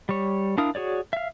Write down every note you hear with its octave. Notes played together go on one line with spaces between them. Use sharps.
G3 C#5
D4 E4 A#4 F5 D#6
F#4 G#4 C#5 D5
E5 F5